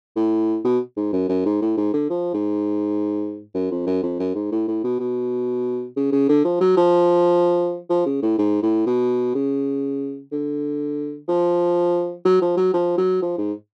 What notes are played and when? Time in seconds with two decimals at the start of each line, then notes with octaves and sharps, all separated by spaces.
0.16 A2
0.64 B2
0.96 G#2
1.13 F#2
1.29 F#2
1.46 G#2
1.61 A2
1.77 G#2
1.93 D3
2.10 F3
2.34 G#2
3.54 F#2
3.71 F2
3.87 F#2
4.03 F2
4.19 F#2
4.34 G#2
4.51 A2
4.68 A2
4.84 B2
5.00 B2
5.97 C#3
6.12 C#3
6.29 D3
6.45 F3
6.61 F#3
6.77 F3
7.90 F3
8.06 C#3
8.22 A2
8.38 G#2
8.62 A2
8.86 B2
9.35 C#3
10.32 D3
11.28 F3
12.25 F#3
12.41 F3
12.57 F#3
12.74 F3
12.98 F#3
13.22 F3
13.38 G#2